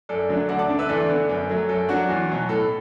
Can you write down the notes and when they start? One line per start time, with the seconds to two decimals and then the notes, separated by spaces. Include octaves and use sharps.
0.09 F#2 A4 D5
0.29 D3 F#3 A3 D4
0.49 D2 D5 F#5
0.59 A5 D6
0.69 D3 A3 D4
0.79 B4 E5
0.89 E2 A4 D5
1.09 D3 B3 D4
1.29 F#2
1.49 F#3 A3
1.69 F#2 A4
1.89 F#3 D4 F#4
2.09 E2
2.29 B2 F#3
2.49 A2 A4